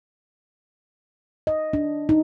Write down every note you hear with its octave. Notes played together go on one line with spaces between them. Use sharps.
D#5
D4
D#4